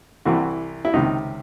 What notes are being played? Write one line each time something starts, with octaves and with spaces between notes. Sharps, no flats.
C2 C3 E3 F#4
E4
C#2 C3 D#3 D#4